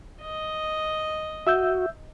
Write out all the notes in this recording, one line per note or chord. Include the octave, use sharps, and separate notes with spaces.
D#5
F#4 E5 E6 G6